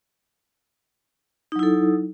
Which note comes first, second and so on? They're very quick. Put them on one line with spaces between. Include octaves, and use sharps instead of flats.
D#4 F#3 E4 A4